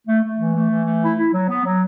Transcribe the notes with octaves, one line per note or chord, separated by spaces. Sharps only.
A3
A3
E3
A3
E3
A3
E4
E4
F#3
B3
F#3